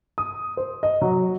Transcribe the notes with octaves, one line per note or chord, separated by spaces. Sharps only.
D#6
C5
D#5
F#3